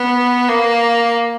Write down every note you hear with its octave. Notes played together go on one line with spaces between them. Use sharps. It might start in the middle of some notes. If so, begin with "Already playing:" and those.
Already playing: B3
A#3